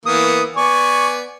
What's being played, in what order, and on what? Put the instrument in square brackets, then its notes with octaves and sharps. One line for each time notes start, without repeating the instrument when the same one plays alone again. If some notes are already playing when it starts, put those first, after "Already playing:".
[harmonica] E3 A#3 B3 [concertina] D#6
[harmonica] B3 D5 G#5 [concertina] C#6